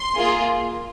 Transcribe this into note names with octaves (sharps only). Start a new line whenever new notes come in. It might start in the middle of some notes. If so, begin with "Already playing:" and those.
Already playing: C6
A#3 F4 G#4